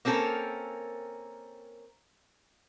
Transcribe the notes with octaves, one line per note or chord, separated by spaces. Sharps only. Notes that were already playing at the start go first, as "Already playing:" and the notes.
A#3 C4 C#4 A4 A#4